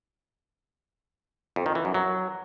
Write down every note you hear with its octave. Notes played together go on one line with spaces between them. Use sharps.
F2
D#3
E3
F#2
F#3